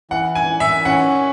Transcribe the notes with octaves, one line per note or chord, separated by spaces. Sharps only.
E3 F#5
G#5
E3
E5
C#4 F#5